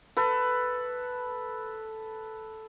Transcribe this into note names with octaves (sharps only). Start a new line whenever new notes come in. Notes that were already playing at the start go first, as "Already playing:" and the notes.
A4 B4